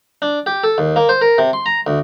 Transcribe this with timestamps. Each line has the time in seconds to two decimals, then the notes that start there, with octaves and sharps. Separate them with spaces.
0.22 D4
0.46 G4
0.64 A4
0.78 D#2
0.96 A#3
1.09 C5
1.21 A#4
1.38 C3
1.53 C6
1.66 A#5
1.87 D2